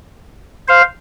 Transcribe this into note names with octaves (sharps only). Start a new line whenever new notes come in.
C5 F5